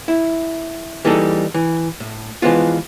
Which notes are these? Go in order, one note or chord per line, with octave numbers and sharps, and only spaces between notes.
E4
E3 G3 A#3 D#4 G#4 A4
E3
A2
E3 F3 G#3 B3 F4